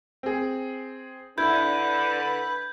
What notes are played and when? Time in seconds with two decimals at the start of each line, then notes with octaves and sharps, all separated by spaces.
0.23 C4 G#4
1.38 D3 D4 E4 B4 G6 G#6